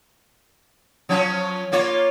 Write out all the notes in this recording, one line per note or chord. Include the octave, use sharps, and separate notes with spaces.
F3 F#3 C#4
A#3 F4 C#5